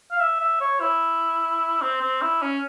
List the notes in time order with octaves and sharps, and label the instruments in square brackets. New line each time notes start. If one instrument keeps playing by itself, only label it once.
[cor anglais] F5
E5
E5
C#5
E4
C4
C4
E4
C#4